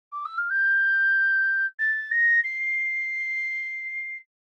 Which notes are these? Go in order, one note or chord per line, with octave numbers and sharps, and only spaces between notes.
D6
E6
F6
G6
A6
A#6
C7